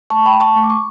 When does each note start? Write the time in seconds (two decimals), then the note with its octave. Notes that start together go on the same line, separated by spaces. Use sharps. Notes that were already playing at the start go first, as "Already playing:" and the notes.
0.10 A3 A5 C#6
0.26 G5 B5
0.33 A3
0.40 A5 C#6
0.56 A3
0.63 D6
0.70 C#6